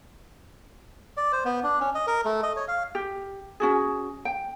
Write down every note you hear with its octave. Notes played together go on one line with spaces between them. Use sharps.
D5
C5
B3
D4
C#4
D#5
A#4
A3
D#5
C#5
F5
G4
C#4 F#4 G#4
G5